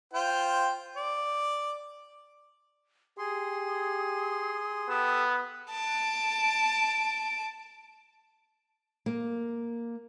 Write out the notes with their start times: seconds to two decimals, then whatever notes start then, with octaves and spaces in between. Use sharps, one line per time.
0.14 F4 C5 G5
0.96 D5
3.18 G4 G#4 C6 D#6
4.89 B3 G4 A4 E6
5.71 A5 D7
9.06 A#3